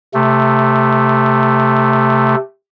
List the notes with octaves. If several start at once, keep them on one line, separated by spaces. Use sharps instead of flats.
C3 A3